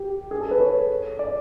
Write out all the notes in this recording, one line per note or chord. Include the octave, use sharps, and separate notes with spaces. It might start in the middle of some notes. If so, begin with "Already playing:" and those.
Already playing: G4
G#4
A4
B4
C#5
D5